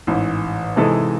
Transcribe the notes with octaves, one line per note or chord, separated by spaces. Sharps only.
A1 G#2 E3
C3 E3 G#3 D#4 A4